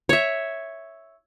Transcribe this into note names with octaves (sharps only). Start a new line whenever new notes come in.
C#5 E5